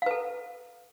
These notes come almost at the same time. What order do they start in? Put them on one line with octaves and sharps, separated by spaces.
F5 B4 A4